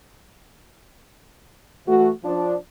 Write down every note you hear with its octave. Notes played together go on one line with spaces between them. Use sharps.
E3 A3 F#4
F3 D4